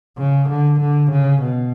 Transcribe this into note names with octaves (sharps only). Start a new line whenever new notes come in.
C#3
D3
D3
C#3
B2